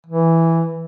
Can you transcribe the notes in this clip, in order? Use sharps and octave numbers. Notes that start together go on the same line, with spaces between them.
E3